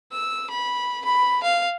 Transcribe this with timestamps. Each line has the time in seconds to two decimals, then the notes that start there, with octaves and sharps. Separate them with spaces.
0.12 E6
0.50 B5
1.05 B5
1.43 F5